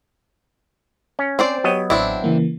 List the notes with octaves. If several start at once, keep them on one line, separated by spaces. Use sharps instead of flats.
C#4
C4 C5 D5
F#3 B3 G4 C#5 D#5 G5
A1 C4 D4 E4
C#3 E3 A#3